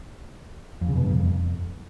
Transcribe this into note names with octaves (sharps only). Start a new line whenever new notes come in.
F2
C#3
B2
G2
F2